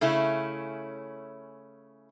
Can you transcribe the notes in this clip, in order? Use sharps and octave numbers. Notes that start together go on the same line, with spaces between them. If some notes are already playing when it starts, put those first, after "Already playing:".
C#3 A3 C#4 E4